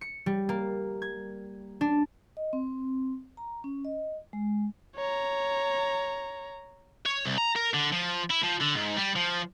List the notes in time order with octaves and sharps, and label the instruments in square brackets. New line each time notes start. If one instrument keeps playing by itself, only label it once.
[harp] C#7
G3
A#3
G#6
D4
[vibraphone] D#5
C4
A#5
C#4
D#5
G#3
[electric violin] C#5 A#5
[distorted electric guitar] C#5
C2
A#5
A#4
D3
F3
E4
F3
D3
G#2
G3
F3